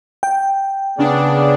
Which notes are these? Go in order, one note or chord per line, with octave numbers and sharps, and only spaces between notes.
G5
C#3 B3 D4 G#4 D5